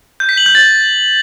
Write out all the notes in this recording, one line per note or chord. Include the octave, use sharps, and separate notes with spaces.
G6
B6
F#7
G6
A6